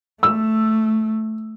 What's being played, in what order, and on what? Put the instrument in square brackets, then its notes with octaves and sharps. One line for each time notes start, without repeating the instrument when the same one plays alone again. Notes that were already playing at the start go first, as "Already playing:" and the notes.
[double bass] A3 [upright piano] E6